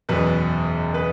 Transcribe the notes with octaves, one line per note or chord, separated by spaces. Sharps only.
F#1 E2 B2 B4
B4